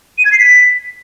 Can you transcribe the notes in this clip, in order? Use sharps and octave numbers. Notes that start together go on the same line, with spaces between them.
D#7
G#6
C7
B6